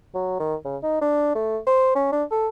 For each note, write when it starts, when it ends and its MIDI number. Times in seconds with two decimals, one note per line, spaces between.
0.14 0.38 54
0.39 0.55 51
0.65 0.77 49
0.83 1.00 63
1.01 1.35 62
1.35 1.58 57
1.67 1.94 72
1.95 2.09 61
2.13 2.24 62
2.31 2.48 69